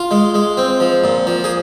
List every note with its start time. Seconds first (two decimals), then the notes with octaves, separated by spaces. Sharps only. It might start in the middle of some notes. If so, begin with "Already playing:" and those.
Already playing: F4
0.11 G#3
0.34 G#3
0.57 C4
0.80 F3
1.04 A#2
1.27 F3
1.44 G#4